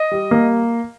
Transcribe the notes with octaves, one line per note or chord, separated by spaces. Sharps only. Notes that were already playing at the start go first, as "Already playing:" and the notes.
Already playing: D#5
G3
A#3